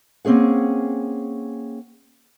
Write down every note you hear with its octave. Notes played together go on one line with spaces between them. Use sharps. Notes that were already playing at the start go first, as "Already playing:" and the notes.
A#3 C4 C#4 G#4 F#5